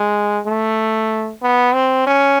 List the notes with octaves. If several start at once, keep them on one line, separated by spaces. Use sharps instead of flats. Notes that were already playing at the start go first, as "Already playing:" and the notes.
Already playing: G#3
A3
B3
C4
C#4